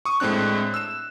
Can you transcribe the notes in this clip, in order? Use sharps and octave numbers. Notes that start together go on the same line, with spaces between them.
C#6 D#6
A2 G#3 C4 D4 F#6
E6 E7